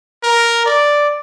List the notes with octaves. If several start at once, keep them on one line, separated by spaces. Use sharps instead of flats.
A#4
D5